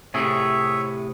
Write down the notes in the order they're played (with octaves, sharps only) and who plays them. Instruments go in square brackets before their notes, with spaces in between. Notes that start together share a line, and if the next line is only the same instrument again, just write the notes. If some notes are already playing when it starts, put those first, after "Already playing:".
[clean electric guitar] A2 C3 G#4 [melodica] C#5 E5